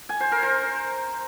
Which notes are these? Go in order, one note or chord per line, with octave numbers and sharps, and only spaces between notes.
G#5
C5
A#4
C5